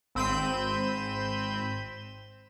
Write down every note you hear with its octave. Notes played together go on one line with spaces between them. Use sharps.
G#1 C4 B5 G6 D#7 E7